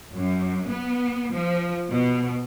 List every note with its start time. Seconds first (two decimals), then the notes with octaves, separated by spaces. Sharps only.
0.15 F#2
0.69 B3
1.33 F3
1.89 B2